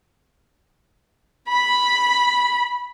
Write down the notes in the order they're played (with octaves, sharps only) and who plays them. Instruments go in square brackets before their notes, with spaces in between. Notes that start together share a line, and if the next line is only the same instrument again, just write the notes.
[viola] B5